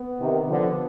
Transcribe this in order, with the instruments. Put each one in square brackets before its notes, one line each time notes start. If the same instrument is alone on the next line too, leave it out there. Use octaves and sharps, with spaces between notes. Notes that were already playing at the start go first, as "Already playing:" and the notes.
Already playing: [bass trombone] B3
[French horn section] C3 D#3
D3 F3